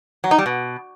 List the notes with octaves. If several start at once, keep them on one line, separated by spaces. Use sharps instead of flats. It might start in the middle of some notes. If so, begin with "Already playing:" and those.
F#3
D#4
G3
B2